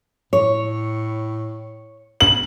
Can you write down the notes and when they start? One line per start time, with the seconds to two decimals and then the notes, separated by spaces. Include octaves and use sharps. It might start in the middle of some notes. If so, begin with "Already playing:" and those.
0.33 A2 C#5
2.20 F#7